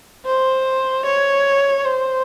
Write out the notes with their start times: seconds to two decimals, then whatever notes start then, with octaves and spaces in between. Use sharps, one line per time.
0.26 C5
1.06 C#5
1.85 C5